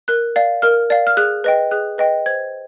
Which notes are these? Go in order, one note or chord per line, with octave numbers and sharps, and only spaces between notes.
A#4 F#6
D5 F5
A#4 F6
D5 F5
F6
G#4 F#6
B4 D#5 G5
G#4 F#6
B4 D#5 G5
C5 G#6